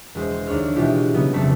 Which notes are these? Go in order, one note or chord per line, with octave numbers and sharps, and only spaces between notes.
E1 G#3 C5
D#2 D4 C#5 F6
B2 E3 G#3 F4 G4
C#3 F#3 B3
F1 F#3 G3 A3 B3 C4